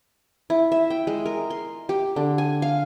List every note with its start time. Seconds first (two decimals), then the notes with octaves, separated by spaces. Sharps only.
0.50 E4
0.72 E5
0.90 G5
1.07 G#3
1.26 A#4
1.50 C6
1.89 G4
2.16 D3
2.38 G#5
2.62 F5